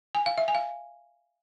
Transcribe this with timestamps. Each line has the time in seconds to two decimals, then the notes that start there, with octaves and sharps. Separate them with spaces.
0.15 G#5
0.26 F5
0.38 E5
0.48 G#5
0.55 F5